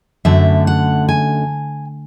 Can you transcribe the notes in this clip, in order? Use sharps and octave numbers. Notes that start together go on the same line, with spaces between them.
F#2 D3 A3 E5
F#5
G#5